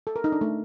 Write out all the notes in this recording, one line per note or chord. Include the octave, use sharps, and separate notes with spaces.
A4
A#4
D#4
D4
A3